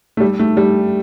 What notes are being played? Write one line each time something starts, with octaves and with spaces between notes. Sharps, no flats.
A3
G3
A3
G3